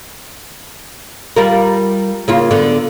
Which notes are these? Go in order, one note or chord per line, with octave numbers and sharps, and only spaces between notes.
G3 F4 A#4
C#3 A#3 F4
D3 B3